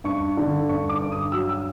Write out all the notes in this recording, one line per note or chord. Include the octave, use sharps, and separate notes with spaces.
G2 C#6
D3
G2 C#6
D6
G2
D#6
F#3 E6
E6